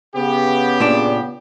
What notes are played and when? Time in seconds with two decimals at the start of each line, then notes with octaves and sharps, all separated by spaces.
0.16 C#3 B3 G4
0.80 A#2 D4